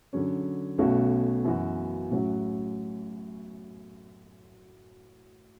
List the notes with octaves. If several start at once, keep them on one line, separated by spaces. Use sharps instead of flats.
D3 F#3 C#4
B1 B2 A3 C#4 F#4
F#2 E3 B3 F#4
A1 A2 F#3 C#4 F#4